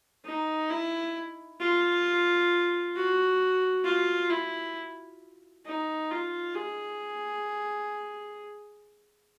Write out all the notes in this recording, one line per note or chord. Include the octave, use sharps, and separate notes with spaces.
D#4
E4
F4
F#4
F4
E4
D#4
F4
G#4